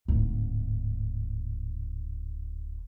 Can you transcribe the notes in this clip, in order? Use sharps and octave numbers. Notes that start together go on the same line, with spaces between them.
D1 G#2